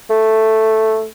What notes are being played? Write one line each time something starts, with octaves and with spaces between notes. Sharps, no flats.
A3